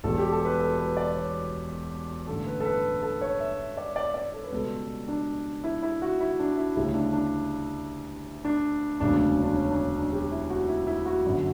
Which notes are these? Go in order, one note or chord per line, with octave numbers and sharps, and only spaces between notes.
E1 E2 B2 G3 A4
G4
A4
B4
A4
B4
D5
C#5
A1 G2 D3 A4
B4
A4
B4
A4
C#5
E5
D5
D5
D5
A4
B4
C#2 B2 G3 A4
D4
E4
E4
F#4
E4
D4
E4
D2 C#3 G3 E4
D4
D4
D4
E1 D2 C#3 F#3 D4
D4
C#4
D4
C#4
D4
C#4
D4
G4
E4
F#4
E4
E4
F#4
G1 F#2 D3